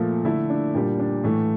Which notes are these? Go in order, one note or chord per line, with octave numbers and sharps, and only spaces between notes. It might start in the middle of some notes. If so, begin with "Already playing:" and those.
Already playing: A#2 F3 A3
D3 A3 E4
D4
A#2 G3 D4
D4
A2 E3 A3